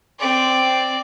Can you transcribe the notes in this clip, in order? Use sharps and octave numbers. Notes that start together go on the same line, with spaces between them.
C4 D5